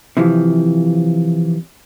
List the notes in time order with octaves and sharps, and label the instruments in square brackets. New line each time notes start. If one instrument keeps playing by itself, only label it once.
[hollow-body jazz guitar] C3 E3 F3